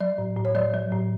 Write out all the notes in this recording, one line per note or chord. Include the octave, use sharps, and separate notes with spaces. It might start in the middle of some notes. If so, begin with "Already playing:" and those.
F#3 D5
A2
A2
C#5
F#3 D5
F#3
A2